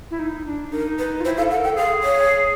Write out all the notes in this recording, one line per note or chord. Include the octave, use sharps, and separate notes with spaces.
E4
D#4
D4
D#4 A#4
B4
F4
E4 C5
A4 F5
A4 F#5
A#4
A4 G5
G#4 F5
C#5